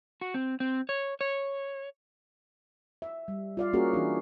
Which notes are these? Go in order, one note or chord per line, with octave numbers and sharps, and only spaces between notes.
F#4
C4
C4
C#5
C#5
E5
G3
F4 D5 F5
A#3 C#4 F#4 G#4 A#4
E3 D4 E4